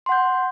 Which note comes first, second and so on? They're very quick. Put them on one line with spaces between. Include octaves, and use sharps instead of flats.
C6 F#5 G6